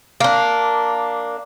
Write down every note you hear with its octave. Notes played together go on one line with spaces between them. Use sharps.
A#3 D4